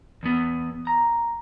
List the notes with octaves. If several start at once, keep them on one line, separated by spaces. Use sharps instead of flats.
E2 B3
A#5